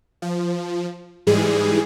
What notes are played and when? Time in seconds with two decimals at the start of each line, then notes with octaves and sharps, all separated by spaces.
0.22 F3
1.27 G#2 E3 G3 G#3 G#4